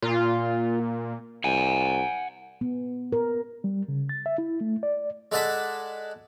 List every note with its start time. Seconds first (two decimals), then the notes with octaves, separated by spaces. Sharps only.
0.02 A#2 F4
1.44 C2 F#5 G#5
2.61 B3
3.13 A#4
3.64 G3
3.88 C#3
4.09 A6
4.26 E5
4.38 E4
4.61 A3
4.83 D5
5.32 G#3 A4 D5 F#5 A5 B5